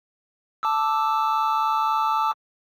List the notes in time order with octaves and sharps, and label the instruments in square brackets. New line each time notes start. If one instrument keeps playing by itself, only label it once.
[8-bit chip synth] A5 D6 E6